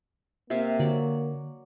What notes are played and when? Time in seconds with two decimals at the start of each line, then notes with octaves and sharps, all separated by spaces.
0.50 C3 A#3 E5 F5
0.79 D3 F#3 D5